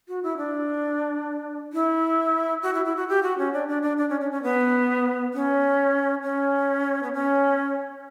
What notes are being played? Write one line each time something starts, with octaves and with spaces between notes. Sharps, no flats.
F#4
E4
D4
E4
F#4
E4
E4
F#4
G4
F#4
C#4
D4
D4
D4
D4
C#4
C#4
C#4
B3
C#4
C#4
B3
C#4